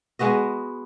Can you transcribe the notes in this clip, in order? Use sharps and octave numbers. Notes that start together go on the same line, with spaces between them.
G#3 B3 F#4 D#5